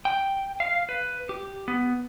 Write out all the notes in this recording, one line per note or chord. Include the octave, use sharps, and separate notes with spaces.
G5
F5
B4
G4
B3